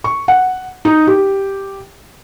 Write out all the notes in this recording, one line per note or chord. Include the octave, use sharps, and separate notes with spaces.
C#6
F#5
D#4
G4